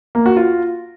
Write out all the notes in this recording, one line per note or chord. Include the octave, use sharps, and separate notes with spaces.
A#3
F#4
F4